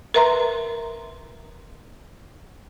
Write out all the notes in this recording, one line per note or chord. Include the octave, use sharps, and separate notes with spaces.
A#4 B4 E5 A#5 C6